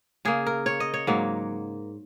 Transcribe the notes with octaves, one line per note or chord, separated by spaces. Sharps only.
C#3 A#3 G#4
A#4
C#5
D#5
C#5
G#2 F#3 A#3